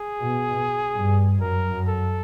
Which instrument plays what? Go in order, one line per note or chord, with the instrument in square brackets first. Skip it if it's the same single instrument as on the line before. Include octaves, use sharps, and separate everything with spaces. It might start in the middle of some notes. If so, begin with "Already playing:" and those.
Already playing: [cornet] G#4
[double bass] B2
G2
[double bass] F#2 [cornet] A#4
[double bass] F#2
[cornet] A4